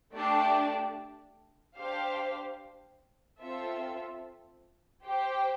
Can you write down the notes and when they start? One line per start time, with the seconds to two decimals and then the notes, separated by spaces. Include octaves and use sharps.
0.13 A3 D4 G4 D5 A5
1.77 D4 G4 C5 F5
3.41 C4 F4 A4 E5
5.04 G4 C5 G5